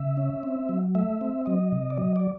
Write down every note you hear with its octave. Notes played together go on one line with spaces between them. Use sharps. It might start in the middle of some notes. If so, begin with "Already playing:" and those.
Already playing: C#3 E5
C#4
C4
F#3
A3 E5
C4
F#3 D#5
C3
D5
F#3 D#5
D5